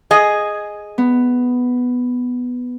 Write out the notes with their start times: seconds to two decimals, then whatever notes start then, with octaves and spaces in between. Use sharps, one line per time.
0.11 G#4 D#5
0.98 B3